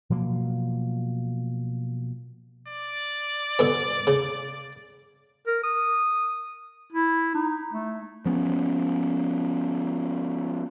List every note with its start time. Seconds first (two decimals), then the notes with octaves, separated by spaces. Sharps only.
0.10 B2 F3 F#3 A#3
2.68 D5
3.59 G2 B2 D3
4.07 C#3
5.47 A#4
5.63 D#6
6.93 E4
7.35 D#4
7.73 A3
8.25 F3 B3 C#4